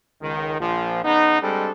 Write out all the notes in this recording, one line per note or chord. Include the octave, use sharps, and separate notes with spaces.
C#2 D#3
A#1 F3
C#3 B3 D#4
G3 G#3 C4 D4 A4